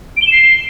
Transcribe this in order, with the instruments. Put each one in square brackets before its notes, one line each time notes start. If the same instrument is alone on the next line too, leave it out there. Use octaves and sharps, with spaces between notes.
[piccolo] D7
G7
E7
C7